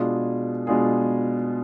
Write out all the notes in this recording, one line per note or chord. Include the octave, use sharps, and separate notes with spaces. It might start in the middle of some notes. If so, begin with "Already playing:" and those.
Already playing: B2 G#3 D4 F4 G#4
B2 G#3 D4 F4 G#4